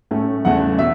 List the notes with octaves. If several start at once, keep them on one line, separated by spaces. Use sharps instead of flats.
A2 A3 C#4
E2 C#3 E3 A3 F#5
B2 E5